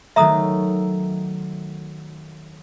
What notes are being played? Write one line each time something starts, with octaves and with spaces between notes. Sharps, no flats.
D#3 F#3 A3 E5 A#5 D#6